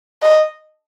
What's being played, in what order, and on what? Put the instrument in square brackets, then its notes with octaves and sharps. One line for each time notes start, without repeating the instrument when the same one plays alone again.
[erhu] D#5